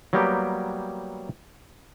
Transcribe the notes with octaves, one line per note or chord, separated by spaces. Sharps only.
F#3 G3 A#3 B3 G4 G5